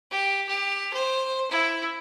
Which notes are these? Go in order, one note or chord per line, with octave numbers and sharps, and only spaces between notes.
G4
G4
C5
E4